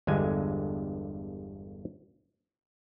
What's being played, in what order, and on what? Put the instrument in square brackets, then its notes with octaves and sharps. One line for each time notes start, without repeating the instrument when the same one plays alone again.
[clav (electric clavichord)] G1 E2 G2 D3 G#3 G#5